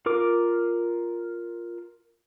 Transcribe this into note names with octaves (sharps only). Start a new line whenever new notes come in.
F4 A#4 D6